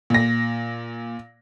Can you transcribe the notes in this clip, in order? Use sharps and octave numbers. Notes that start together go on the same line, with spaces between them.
A#2 A#6